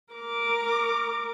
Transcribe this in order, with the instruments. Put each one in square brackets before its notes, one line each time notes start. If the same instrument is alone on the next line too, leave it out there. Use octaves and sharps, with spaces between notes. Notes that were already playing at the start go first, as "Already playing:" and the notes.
[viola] A#4 D6